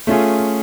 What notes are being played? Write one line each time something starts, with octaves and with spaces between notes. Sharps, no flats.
A3 C#4 F4 G#4